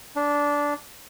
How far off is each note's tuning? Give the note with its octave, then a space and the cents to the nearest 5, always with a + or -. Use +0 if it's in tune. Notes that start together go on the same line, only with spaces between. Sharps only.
D4 -15